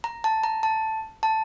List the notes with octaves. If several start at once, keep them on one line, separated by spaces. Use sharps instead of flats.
A#5
A5
A#5
A5
A5